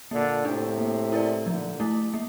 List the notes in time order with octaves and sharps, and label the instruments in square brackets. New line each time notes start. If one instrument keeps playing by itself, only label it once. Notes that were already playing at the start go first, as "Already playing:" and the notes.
[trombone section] A#2 D3 [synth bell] A#3
[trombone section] A2 C3 [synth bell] D4 A4
[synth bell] A#3
E4 A#4 D5
[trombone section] A#2 D3 [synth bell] F3
[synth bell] A3 E4
A#3